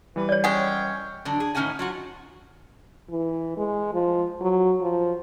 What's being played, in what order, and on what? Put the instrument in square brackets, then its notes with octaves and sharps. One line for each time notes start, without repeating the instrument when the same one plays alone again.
[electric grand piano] E3 G3 [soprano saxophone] B4
[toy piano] C#5 D5
[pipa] G#3 C#4 [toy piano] F#5 [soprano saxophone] G5
[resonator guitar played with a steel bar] D3 F#3 D4
G#4
A2 D#3 C#4 D#4 F#5 G#5
F#3 F4 F#4
[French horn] E3
G#3
F3
F#3
F3